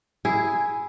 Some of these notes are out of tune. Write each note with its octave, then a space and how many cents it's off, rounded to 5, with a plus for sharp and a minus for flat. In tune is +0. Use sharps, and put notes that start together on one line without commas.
E4 +0 G#4 +0